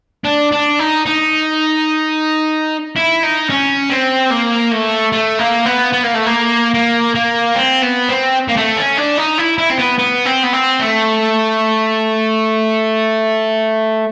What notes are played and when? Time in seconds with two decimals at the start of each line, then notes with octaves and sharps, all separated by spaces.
0.25 D4
0.52 D4
0.79 D#4
1.06 D#4
2.96 E4
3.23 D#4
3.50 C#4
3.90 C4
4.31 A#3
4.71 A3
5.12 A3
5.39 A#3
5.66 B3
5.93 B3
6.04 A#3
6.15 A3
6.26 A#3
6.74 A#3
7.15 A#3
7.55 C4
7.82 B3
8.09 C4
8.49 A#3
8.57 A3
8.77 C#4
8.97 D4
9.18 D#4
9.38 E4
9.58 E4
9.70 C4
9.79 B3
9.98 B3
10.25 C4
10.43 B3
10.53 C4
10.80 A3